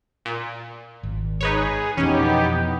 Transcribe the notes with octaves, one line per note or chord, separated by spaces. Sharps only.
A#2
G#1
D#4 G#4 B4 C#5
F2 B2 E3 B3 C#4 D#4 G4